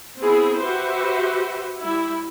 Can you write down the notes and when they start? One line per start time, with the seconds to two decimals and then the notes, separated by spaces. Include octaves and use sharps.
0.20 B3 C4 E4 G#4
0.58 F#4 G4 B4 C5 E5
1.80 G3 E4